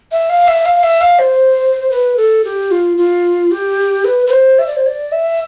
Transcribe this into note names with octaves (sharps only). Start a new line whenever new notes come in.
E5
F5
E5
F5
E5
F5
C5
B4
A4
G4
F4
F4
G4
B4
B4
C5
E5
D5
C5
D5
E5